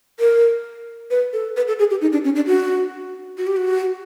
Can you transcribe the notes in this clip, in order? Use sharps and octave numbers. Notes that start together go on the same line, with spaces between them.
A#4
B4
A4
B4
A4
G#4
G4
D#4
D4
C#4
D4
F#4
F#4
G4
F#4